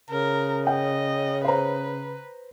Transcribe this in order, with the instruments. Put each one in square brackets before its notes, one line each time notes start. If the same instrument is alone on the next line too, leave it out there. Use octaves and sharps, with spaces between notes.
[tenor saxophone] C#3 [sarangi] A#4
[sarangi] D#5 [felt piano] G5
[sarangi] B4 [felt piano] C5 A#5